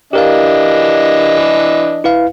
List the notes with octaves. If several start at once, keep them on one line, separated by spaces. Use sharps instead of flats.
E3 D4 G4 A#4 D#5 F5
E4 B4 F5